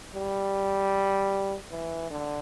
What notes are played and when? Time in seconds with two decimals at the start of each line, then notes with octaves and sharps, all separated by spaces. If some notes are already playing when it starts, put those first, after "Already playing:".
0.15 G3
1.71 E3
2.10 D3